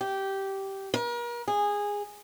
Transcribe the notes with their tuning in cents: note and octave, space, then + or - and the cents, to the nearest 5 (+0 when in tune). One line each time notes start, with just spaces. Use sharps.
G4 -10
A#4 +40
G#4 -15